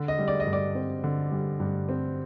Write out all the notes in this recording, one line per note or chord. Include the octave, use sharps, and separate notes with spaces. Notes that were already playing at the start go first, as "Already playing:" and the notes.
Already playing: D3
D#5
G3
D5
D#5
G2
D5
C4
D3
G3
G2
C4